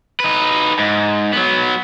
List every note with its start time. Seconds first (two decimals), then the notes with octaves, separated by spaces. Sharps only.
0.20 D#4 B4
0.79 G#2
1.33 F#3 B3